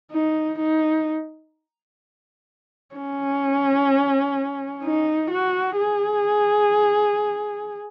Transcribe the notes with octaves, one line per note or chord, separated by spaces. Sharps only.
D#4
D#4
C#4
D#4
F#4
G#4